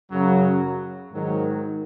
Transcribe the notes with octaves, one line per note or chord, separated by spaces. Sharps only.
F#2 C#3 F#3
G#2 D#3 F#3